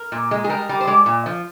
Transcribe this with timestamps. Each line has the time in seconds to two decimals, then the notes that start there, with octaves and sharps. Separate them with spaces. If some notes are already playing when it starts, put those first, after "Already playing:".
Already playing: A#4
0.12 A#2
0.31 G#3
0.44 G#4
0.49 G3 A#4
0.69 G3
0.81 C5
0.87 G#3 D5
1.06 A#2
1.26 F3